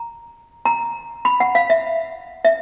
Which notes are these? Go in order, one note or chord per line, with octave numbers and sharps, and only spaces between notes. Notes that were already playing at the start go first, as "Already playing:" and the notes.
Already playing: A#5
A#5
B5
F#5
F5
E5
E5